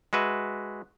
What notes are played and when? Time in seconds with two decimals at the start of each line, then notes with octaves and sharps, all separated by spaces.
0.13 G#3 F#4 B4 E5